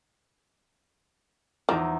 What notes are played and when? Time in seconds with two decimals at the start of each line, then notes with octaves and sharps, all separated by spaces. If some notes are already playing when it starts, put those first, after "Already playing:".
1.69 E2 F3 D#4 D6